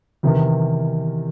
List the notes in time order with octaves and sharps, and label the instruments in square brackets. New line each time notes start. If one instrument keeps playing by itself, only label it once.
[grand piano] E2 C3 D#3